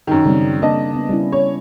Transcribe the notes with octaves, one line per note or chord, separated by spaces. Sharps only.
F#2 D#3
C#3 G3 C4
A#3 D4 D#5 A5
B3
G3 C#4 E4
C#5